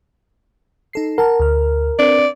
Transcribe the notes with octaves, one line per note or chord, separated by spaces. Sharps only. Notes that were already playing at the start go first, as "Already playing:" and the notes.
D#4 A4 C7
A#4 F#5 A5 F6
D2 F6
C4 D4 D5